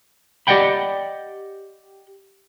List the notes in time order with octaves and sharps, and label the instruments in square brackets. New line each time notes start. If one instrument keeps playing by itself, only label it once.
[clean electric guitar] G4 D5 D#5 F#5 G5 B5